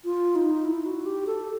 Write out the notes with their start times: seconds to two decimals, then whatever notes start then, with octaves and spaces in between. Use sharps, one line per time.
0.05 F4
0.36 D#4
0.65 E4
0.86 F#4
1.06 G4
1.27 A4